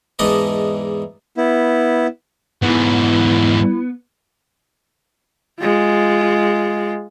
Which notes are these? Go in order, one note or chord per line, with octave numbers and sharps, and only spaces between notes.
E2 G#2 D4 D5 D#5
B3 E4
G#2 E3 B3 E4
G#3 F4